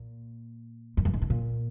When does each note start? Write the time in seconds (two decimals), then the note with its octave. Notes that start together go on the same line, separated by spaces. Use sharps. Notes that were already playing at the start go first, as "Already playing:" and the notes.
Already playing: A#2
0.97 F#2
1.05 G2
1.14 G#2
1.22 A2
1.30 A#2